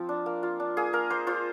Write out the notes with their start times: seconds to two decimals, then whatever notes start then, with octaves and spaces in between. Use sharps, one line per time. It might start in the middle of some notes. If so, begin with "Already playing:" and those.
Already playing: F3 C4 F4
0.09 D4
0.26 A#3
0.43 F4
0.60 D4
0.77 A#3 G#4
0.93 A#3 A#4
1.10 A#3 C5
1.27 F4 C5